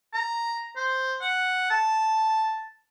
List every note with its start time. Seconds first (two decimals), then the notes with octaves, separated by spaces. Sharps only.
0.14 A#5
0.76 C5
1.21 F#5
1.70 A5